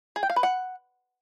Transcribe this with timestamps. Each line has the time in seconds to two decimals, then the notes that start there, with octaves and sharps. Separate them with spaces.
0.16 G#4
0.23 G5
0.30 F5
0.36 B4
0.43 F#5